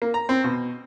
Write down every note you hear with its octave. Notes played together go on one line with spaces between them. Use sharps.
A#3
A#5
C4
B2